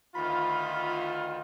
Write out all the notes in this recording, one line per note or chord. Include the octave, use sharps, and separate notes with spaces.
D2 D#3 F4 B5